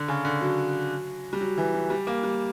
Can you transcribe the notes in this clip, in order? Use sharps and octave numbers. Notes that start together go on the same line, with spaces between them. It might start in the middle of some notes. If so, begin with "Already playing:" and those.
Already playing: D3
C#3
D3
F#3
G3
F#3
E3
F#3
G3
A#3
G3